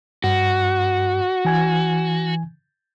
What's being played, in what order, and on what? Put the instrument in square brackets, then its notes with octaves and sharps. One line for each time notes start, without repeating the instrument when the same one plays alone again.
[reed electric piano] G2 [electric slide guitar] F#4
[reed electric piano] E3 G#5 G#6